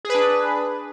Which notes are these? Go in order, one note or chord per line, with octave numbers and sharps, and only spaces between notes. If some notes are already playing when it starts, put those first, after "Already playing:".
D4 G#4 B4